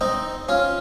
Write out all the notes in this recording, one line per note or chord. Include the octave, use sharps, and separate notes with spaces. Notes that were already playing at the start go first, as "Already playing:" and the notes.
C4 D#4
C#4 F4